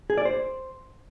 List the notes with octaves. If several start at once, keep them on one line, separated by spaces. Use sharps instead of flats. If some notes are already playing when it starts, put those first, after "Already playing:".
G#4
D5
C5